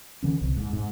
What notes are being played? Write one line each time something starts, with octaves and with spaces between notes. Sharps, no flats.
D3 E3 C#4
C2
G#2
G#2